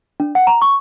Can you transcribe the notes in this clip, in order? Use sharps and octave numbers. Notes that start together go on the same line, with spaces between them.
D4
F#5
A#5
C#6